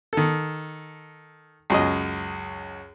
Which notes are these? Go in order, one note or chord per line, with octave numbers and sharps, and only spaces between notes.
D#3 A4
C#2 F#2 D#5